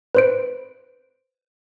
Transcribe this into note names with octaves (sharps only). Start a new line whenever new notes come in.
B4 C5 D7